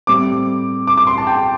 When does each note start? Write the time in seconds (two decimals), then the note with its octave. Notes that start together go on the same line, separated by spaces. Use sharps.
0.07 A2 G3 C4 D6
0.87 D6
0.97 D6
1.07 C6
1.18 A5
1.27 G5